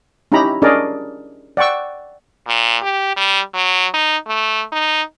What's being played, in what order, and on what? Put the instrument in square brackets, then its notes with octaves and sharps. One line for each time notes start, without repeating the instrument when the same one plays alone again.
[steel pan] C#4 D#4 E4 G4 A#5 B5
C#4 D4 G#4 A#4 D5 D#5
D5 F#5 G5 C#6 E6
[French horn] A#2
G4
G3
F#3
D#4
A3
D#4